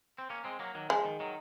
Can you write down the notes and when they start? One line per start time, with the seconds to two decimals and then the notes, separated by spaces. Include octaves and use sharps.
0.18 C4
0.30 A#3 C#4
0.44 G#3 C4
0.60 F#3 A#3
0.75 D#3 F#3
0.89 F3 G#3
1.05 D#3
1.20 D#3 F#3